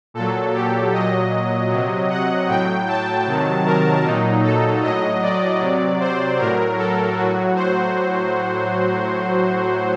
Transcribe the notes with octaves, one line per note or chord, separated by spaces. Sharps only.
A#2 F#3 A4
G4
A#2 F#3 D#5
C3 F#3
F#5
A2 F#3 G5
A5
C3 D#3 F#3
A#4
A#2 F#3 D#4
A4
A2 F#3 D#5
D5
C3 F#3
C5
A2 F#3 A#4
A4
A2 F#3 F#4
C5